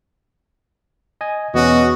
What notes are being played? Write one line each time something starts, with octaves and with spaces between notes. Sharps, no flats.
D#5 G#5
E2 B2 B3 C#4 F#4 D#5